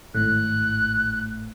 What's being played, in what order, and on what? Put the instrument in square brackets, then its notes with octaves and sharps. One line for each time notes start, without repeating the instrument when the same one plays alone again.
[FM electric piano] G#1 A2 [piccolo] F#6